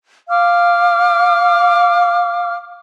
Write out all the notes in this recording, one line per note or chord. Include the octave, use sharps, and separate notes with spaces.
F5 D6 F6